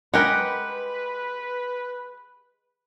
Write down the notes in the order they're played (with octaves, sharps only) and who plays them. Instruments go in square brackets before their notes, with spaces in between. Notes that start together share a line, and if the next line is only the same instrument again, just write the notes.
[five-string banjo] G#3 G4 A#4 [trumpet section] B4 [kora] F#5 G5